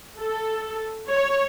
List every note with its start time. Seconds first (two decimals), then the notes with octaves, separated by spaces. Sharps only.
0.20 A4
1.10 C#5